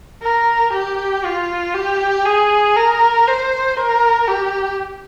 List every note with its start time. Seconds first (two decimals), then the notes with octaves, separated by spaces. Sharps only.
0.22 A#4
0.73 G4
1.25 F4
1.74 G4
2.25 G#4
2.76 A#4
3.27 C5
3.77 A#4
4.28 G4